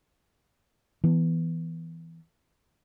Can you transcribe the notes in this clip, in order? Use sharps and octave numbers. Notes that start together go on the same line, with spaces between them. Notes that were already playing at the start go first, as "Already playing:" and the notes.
E3 B3